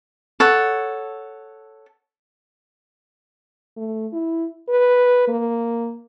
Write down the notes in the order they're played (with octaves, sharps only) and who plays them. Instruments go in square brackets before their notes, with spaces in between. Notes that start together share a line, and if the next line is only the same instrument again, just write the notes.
[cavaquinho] A4 C#5 F#5
[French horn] A3
E4
B4
A#3